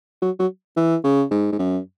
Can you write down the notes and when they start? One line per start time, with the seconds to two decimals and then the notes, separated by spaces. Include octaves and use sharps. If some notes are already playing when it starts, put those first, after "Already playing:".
0.22 F#3
0.39 F#3
0.77 E3
1.04 C#3
1.31 G#2
1.52 G#2
1.59 F#2